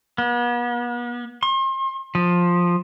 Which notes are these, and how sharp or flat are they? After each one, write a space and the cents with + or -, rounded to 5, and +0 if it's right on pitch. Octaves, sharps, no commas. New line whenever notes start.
B3 -40
C6 +40
F3 +10